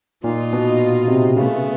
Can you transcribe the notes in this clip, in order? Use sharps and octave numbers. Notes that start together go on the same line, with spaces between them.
A#2 D#4 F4
B2
C3
C#3 A3 B3